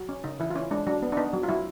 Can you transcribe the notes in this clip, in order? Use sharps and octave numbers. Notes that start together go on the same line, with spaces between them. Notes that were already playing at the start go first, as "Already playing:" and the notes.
Already playing: F#3
C#4
C#3 D#4
E3 E4
F4
C#4 E4
G#3 D4
F#3 D4
B3
D4
B3 D#4
F#3
F4
F#3 E4